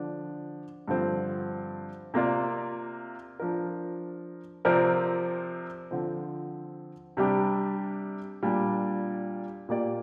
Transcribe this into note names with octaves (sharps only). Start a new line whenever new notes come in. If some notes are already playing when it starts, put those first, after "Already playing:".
Already playing: D3 F3 D4
G2 D3 F3 C4
C3 A#3 F4 D5
F3 D4 A#4
C3 F3 C4 A#4 D5
D3 F3 C4
C3 G3 D4 G4
A#2 G3 D4
A#2 A#3 G4 D5